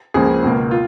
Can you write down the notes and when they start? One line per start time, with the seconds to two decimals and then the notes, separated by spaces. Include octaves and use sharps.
0.14 C#2 C#3 F3 A#3 G#4
0.43 C#2 B2 A#3
0.71 F4